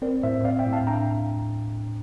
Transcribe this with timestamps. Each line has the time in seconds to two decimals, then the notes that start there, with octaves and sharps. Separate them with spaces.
0.02 C4 A#4 D5
0.23 A2 C5 E5
0.44 C4 D5 F5
0.59 E5 G5
0.66 A2
0.73 F5 A5
0.87 D4 G5 A#5